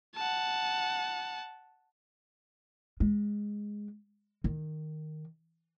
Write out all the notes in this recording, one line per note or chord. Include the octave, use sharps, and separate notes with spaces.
F#5 A5
G#3
D#3